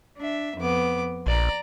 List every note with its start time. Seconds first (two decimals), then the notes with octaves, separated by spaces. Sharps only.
0.18 D4 E5
0.58 F2 B3 D6
1.27 A#1 D5 A#5